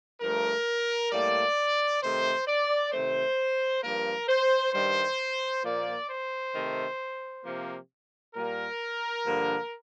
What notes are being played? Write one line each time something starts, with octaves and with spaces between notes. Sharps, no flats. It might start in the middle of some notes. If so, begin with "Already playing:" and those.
G2 F3 A3 A#4
A2 G3 A#3 D5
C3 D#3 A3 C5
D5
C3 D#3 A3 C5
G2 F3 A#3 A#4
C5
G2 D#3 G3 C5
A#2 F3 A#3 D5
C5
C3 D#3 A3
C3 F3 A#3
A#2 G3 A#3 A#4
G2 D3 F3 A#3